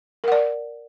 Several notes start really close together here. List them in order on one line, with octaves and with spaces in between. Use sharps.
A#4 F#5 D5